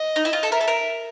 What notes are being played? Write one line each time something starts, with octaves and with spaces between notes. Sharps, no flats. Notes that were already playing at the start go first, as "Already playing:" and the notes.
Already playing: D#5
D#4
E4
F4
A4
A#4 E5
A4
A#4